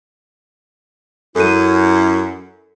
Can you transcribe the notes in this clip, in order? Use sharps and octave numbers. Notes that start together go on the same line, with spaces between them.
F#2 E4 A4 D#7